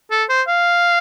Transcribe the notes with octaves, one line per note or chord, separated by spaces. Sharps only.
A4
C5
F5